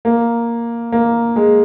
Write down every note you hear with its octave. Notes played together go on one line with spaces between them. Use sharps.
A#3
A#3
G#3